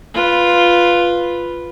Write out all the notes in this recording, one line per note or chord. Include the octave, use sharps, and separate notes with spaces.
F4 B4